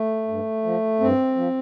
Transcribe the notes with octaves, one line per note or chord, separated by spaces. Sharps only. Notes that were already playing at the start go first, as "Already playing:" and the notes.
Already playing: A3
G2
F3
G2 C4
F3